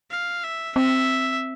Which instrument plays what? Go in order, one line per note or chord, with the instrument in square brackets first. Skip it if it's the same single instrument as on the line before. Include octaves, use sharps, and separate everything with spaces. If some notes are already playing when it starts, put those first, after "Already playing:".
[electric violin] F5
E5
[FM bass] C4 [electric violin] E5